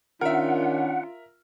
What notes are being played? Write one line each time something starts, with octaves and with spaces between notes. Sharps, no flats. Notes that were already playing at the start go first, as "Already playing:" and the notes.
D#3 C#4 D4 F4 A#4 E5 F#5